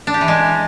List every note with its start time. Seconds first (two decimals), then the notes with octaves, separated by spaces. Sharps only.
0.07 D4
0.14 G4
0.21 E3
0.28 G#3